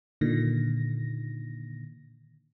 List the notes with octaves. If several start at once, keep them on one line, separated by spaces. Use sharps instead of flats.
A#2 D3 D#3 A#6